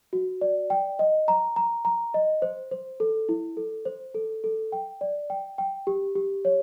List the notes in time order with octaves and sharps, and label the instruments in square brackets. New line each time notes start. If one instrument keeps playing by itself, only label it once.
[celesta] F#4
D5
G5
D#5
A#5
A#5
A#5
D#5
C5
C5
A4
E4
A4
C5
A4
A4
G5
D5
G5
G5
G4
G4
C#5